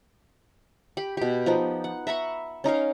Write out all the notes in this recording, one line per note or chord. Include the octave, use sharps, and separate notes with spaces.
G4 B5
B2 G4
F3 B3 D#4
F#5
E5 A#5 B5 C#6
C#4 D#4 A#4 F5